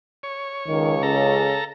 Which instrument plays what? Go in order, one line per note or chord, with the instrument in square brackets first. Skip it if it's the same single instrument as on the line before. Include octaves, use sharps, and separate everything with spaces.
[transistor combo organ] C#5
[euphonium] C#2 [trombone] D#3
[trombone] C#3 [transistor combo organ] A4 A#5